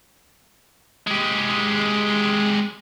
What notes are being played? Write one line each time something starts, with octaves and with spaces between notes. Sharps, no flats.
G#3 G4